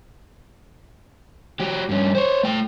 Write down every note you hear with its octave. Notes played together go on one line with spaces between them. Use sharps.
F#3 G4
G2 C#4
C5 C#5
A3 G5